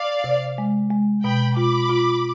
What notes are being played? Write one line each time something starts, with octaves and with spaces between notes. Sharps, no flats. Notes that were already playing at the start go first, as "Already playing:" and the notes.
Already playing: D5 F5
C3
G#3
G#3
B2 G5 B5
F4 B5 D6
F4